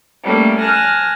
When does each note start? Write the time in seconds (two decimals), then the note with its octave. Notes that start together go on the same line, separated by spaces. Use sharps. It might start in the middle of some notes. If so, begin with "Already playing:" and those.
0.23 G3 A3 A#3 C#4 A4
0.59 G#5 A5 F6 F#6 A#6